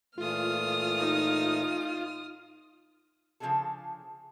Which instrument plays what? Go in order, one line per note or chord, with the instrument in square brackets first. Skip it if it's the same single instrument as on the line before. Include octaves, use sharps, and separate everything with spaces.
[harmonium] A#2 E3 A3 [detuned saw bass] F4 [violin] D#6 F6
[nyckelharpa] D#4
[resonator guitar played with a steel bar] C#3 F3 F#3 D4 G#4 A4